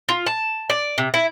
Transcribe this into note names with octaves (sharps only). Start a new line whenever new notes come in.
F4
A5
D5
C3
E4